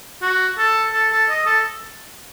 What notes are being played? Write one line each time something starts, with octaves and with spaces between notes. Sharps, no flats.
F#4
A4
A4
A4
D#5
A4